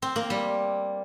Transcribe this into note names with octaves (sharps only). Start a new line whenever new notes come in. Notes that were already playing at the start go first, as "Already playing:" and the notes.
C4
A#3
G3